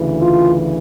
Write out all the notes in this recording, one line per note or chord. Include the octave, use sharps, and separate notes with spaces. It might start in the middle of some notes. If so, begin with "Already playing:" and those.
Already playing: D2 C#3 E3
F4